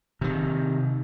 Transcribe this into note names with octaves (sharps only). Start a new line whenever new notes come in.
C3 D#3